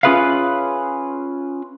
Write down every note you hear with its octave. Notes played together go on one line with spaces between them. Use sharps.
C#4 F4 G#4 B4 E5 F5